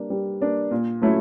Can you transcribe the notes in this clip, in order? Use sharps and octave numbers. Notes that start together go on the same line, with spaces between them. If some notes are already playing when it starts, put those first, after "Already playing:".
Already playing: G3 A#3 D4
G3
A#3 D4
A#2
F#3 A3 C#4 E4